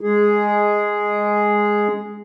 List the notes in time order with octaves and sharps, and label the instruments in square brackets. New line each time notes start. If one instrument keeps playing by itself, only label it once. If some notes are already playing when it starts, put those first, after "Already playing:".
[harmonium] G#3 G#4